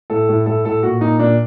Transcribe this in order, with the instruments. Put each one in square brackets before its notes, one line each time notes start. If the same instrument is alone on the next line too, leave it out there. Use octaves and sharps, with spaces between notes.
[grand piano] A2 A4
A2
A2 A4
A2 A4
A#2 F#4
A#2 D#4
A#2 D4